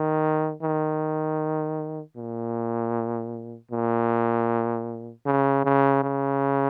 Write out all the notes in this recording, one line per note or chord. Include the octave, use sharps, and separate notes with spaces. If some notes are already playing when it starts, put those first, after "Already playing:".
Already playing: D#3
D#3
A#2
A#2
C#3
C#3
C#3